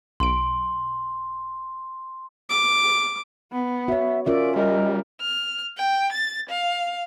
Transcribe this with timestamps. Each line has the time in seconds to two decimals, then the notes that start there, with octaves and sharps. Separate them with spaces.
0.20 B1 C6 D7
2.50 D6
3.52 B3
3.88 F#4 C#5 E5
4.26 C#4 F4 A#4 D5 E5
4.56 G3 A#4 D#5
5.21 F6
5.77 G5
6.12 A6
6.50 F5